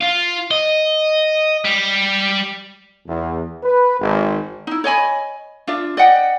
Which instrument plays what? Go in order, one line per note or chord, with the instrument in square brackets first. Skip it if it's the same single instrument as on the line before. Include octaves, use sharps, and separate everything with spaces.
[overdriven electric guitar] F4
D#5
G3
[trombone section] E2
B4
G#1
[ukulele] D#4 E4
C#5 D#5 G#5 B5
D4 F4 E5
D5 D#5 F#5 G5